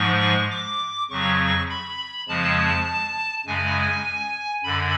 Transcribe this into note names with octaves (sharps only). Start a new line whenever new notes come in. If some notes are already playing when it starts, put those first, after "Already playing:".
Already playing: G#2 F3 G#3 C#6
D6
F2 C#3 F#3 C#6
B5
F2 C#3 F3 G#3 A5
F#2 C#3 G#3 G#5
F#2 D3 B5